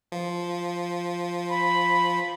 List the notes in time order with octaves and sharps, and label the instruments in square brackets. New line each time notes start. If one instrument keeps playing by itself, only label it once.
[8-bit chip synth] F3
[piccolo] B5